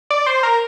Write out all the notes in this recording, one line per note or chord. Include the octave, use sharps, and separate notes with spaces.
D5
C5
A#4